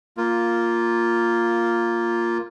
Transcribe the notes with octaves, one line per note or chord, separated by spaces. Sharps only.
A#3 F4